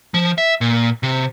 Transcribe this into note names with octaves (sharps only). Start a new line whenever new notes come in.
F3
E5
A#2
C3